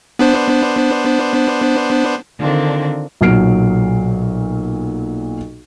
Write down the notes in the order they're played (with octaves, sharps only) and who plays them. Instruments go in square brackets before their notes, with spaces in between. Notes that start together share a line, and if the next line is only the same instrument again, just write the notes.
[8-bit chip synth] B3 D4 C5
[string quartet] D3 D#3 C4 D4 F4 A#4
[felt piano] B1 A#2 F#3 F6 C7 D7